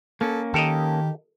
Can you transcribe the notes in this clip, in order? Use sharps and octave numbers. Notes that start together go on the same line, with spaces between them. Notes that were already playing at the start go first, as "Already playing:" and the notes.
A#3 C#4 A4
D#3 G4 A4 A#4 D#5